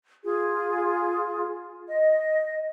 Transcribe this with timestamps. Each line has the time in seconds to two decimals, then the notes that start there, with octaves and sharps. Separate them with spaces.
0.24 F4 G#4
1.88 D#5